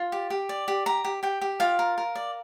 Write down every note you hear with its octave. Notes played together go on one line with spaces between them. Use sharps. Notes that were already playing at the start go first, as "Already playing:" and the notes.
Already playing: F4
G4
G4
D5
G4
G4 A#5
G4
G4 G5
G4
F4 F5
A#4
A#4
D5